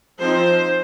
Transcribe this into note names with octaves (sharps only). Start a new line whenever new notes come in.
F3 C4 D#4 C5